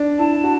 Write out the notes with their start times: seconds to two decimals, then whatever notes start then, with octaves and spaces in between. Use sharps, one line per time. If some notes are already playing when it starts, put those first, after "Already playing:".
Already playing: D4
0.18 E4 A5
0.44 F#4